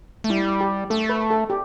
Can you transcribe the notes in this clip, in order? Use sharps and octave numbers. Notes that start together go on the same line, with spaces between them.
A3
G3 E4
G4
A3 A4
B4
A4
G4